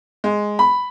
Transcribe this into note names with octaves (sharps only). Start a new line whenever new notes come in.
G#3
B5